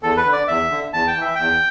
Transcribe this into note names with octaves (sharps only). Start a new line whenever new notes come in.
E2 A4
B4
D3
D5
E2 E5
D3
E2 A5
G5
E3
E5
E2 G5